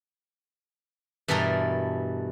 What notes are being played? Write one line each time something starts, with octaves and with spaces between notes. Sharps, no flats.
G2 B2 E3 A4 A#4 A#5